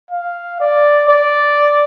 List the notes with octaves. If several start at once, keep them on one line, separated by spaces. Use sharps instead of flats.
F5
D5
D5